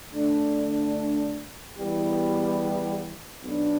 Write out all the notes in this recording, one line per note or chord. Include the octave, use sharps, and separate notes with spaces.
D3 A3 D4
E2 E3 G3 B3 G4
B1 B2 B3 D4